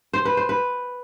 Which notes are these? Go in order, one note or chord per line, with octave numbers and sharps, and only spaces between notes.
C5
B4
C5
B4